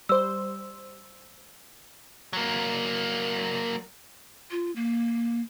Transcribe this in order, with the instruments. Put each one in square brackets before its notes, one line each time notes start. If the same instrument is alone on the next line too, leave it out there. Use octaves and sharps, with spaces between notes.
[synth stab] G3 C5 [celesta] E6
[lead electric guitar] F#3 A#3
[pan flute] F4
A#3